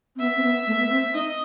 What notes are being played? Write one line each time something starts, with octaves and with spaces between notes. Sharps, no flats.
C4
B3 E5
C4
B3
A3
B3
C4
D#4 D#5